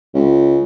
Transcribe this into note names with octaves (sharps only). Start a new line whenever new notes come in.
C#2